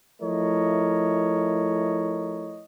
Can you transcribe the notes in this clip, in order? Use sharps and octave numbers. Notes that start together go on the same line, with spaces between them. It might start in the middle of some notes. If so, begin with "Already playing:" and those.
F3 A3 E4 A#4 C#5 D#5